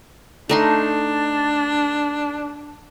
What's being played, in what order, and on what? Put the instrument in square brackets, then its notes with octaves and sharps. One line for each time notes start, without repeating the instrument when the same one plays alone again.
[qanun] A3 D#4 C6 [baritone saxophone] D4